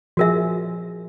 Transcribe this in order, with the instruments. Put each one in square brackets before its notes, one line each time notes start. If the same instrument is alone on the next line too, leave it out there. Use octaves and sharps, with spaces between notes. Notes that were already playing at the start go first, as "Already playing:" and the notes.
[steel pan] F3 G#4 [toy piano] F#4 A#4 E5